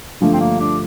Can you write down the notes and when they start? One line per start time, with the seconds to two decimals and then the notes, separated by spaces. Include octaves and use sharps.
0.20 G2 D3 F3 A3 A#3
0.33 C4
0.41 A#3
0.60 D4